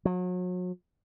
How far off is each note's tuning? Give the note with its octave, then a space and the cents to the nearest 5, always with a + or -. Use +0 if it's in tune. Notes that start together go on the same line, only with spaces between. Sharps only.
F#3 -35